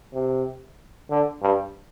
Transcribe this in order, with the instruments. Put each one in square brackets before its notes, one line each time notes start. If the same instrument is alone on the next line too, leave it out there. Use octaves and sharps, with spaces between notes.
[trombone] C3
D3
G2